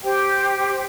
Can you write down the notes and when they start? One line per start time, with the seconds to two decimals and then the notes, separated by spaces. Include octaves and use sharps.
0.04 G4 C5 G5